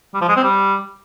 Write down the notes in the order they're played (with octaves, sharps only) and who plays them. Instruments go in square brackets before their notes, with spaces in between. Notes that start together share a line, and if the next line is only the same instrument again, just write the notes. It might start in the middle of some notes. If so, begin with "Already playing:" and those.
[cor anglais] G3
F3
G#3
C4
G3